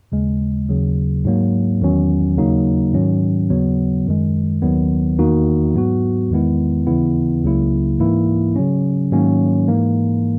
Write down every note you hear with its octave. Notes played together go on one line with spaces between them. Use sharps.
D#2 C#3 G#3
D#2 C#3 F#3
G#2 F#3 A#3
E2 D#3 F#3 C#4
D#2 C#3 F#3 A#3 D#4
G#2 D#3 F#3 C#4
D#2 C#3 F#3 B3
F#2 D#3 G#3
D#2 D#3 F#3 B3
E2 D#3 A#3 D#4 F#4
G#2 F#3 B3 F#4
E2 D#3 G#3 B3 E4
D#2 C#3 E3 B3 E4
C#2 C#3 F#3 A#3 E4
G#2 E3 A#3 E4
C#3 F#3 C#4
G#2 D#3 F#3 A#3 C#4
G#2 E3 A#3